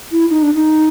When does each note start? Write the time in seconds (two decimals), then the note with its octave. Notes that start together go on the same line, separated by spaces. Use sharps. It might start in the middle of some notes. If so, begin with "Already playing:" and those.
0.12 E4
0.30 D#4
0.42 D4
0.54 D#4